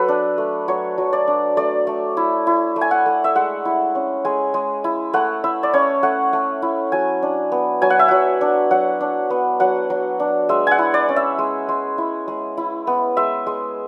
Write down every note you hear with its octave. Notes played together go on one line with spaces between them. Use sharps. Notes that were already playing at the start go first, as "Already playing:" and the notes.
Already playing: F#3 A4 B4
D4
A3
F#3 C#5
F#3
D5
D4
A3 D5
A3
E4
E4
A3
G#5
F#5
A3
E5
G#3 F#5
E4
C#4
G#3 G#5
G#3
E4
A3 F#5
E4 E5
D5
C#4 C#5
A3 F#5
A3
E4
F#3 G#5
D4
B3
F#3 G#5
F#5
E5
F#3 F#5
D4
F#3 F#5
D4
B3
F#3 F#5
F#3
D4
G#3 E5
F#5 G#5
E4
D5
C#4
E5
G#3
G#3
E4
G#3
E4
B3
G#3 E5
G#3